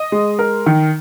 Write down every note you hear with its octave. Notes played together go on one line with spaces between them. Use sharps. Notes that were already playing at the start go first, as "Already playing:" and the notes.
Already playing: D#5
G#3
A#4
D#3